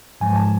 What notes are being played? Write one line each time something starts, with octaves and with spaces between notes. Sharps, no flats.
G#2 F3 G#3 G#5
A5